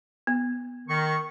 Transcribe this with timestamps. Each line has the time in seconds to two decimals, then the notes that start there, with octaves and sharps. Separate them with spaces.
0.27 B3
0.88 D#3 C#6